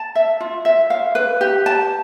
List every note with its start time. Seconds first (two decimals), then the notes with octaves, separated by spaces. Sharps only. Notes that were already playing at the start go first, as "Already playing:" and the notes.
Already playing: A5
0.15 E5
0.40 F4
0.65 E5
0.90 F5
1.15 B4
1.41 G4
1.66 A5